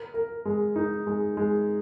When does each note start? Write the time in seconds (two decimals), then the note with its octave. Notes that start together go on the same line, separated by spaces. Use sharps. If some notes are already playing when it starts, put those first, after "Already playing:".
Already playing: A#4
0.14 A#4
0.45 G#3
0.76 D#4
1.07 G#3
1.37 G#3